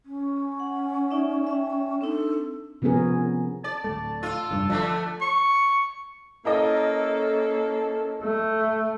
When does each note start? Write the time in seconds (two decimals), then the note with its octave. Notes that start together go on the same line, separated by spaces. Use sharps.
0.05 C#4
0.60 F#5
1.11 D#4 D5 E5
1.47 E5 G5
2.01 C4 D4 D#4 A4
2.82 C3 F3 B3 C#4 G#4 A#4
3.64 D5 A5
3.84 D1 A3
4.23 F4 A4
4.50 F1 G2
4.70 D3 F3 A3
5.21 C#6
6.45 A#3 C#4 E4 A4 A#4 D#5
8.22 A3